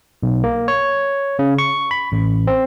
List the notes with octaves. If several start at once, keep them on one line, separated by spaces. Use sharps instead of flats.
B1
A#3
C#5
C#3
C#6
B5
A1
C4